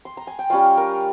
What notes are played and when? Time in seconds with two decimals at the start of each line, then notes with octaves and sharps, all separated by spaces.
0.05 C6
0.17 A#5
0.27 G#5
0.39 G5
0.50 G3 C#4 F4 F5
0.77 A#4